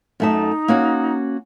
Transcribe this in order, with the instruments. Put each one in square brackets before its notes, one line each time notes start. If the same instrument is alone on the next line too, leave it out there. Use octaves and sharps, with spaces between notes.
[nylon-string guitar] F#2 A3 A5 [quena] D#4
[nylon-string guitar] A#3 C#4 F#4